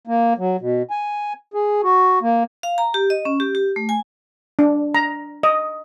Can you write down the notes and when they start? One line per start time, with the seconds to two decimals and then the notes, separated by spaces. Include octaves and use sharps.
0.07 A#3
0.38 F#3
0.60 B2
0.90 G#5
1.54 G#4
1.83 F#4
2.22 A#3
2.63 F5
2.78 A#5
2.94 G4
3.10 D#5
3.25 C#4
3.40 G4
3.55 G4
3.76 A3
3.89 G#5
4.59 D4
4.95 A#5
5.43 D#5